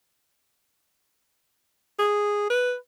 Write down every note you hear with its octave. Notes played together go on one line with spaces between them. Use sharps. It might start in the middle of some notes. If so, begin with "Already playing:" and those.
G#4
B4